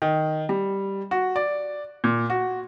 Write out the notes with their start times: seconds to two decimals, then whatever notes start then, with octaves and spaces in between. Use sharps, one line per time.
0.02 D#3
0.49 G3
1.11 F#4
1.36 D5
2.04 A#2
2.30 F#4